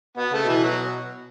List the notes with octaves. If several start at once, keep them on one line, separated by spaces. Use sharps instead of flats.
B2 B3
C#3 A3
B2 E3
F#3